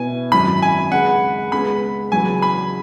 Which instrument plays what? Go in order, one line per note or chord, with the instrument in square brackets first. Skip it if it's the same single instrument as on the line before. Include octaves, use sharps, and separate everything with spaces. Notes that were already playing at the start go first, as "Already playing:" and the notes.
Already playing: [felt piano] B2 B3 E4 [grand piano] G#5
[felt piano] G#1 F#2 F#3 E4 [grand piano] B5
[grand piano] G#5
[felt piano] C#2 C#3 G#3 [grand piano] F#5
[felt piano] C#2 C#3 G#3 B3 [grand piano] B5
[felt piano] E2 C#3 F#3 [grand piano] G#5
[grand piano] B5